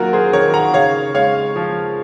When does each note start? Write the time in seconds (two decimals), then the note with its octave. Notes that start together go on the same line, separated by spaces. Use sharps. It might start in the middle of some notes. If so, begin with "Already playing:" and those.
Already playing: D#3 F#3 A#3 F4 F#4 A#4
0.13 G#4 C5
0.33 D#3 A#4 C#5
0.54 F#5 A#5
0.73 C#3 C#5 F5
1.15 G#3 C#5 F5
1.56 F3